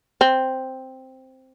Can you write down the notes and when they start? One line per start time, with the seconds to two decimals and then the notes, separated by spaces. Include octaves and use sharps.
0.21 C4